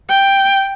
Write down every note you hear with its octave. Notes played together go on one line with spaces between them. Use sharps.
G5